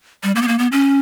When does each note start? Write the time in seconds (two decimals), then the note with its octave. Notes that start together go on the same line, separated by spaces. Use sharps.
0.23 G3
0.36 A#3
0.42 B3
0.48 A#3
0.59 B3
0.72 C#4